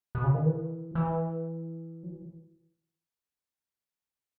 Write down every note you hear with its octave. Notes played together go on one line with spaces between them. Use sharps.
B2
C#3
D#3
E3
E3
F#3
E3